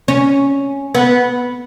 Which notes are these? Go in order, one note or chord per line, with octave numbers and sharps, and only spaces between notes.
C#4
B3